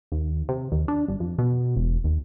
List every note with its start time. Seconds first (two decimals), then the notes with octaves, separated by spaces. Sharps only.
0.12 D#2
0.49 C3
0.72 D#2
0.88 D4
1.08 G1
1.20 F2
1.38 B2
1.76 E1
2.04 D#2